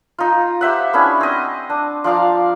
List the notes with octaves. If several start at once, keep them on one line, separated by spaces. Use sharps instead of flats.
D#4 F4
G4 C5 E5 F#5
B3 C#4 D4 E4
C4 D#5
D4
F3 D5 F5 A#5